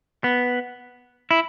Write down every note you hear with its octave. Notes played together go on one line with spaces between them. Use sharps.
B3
E4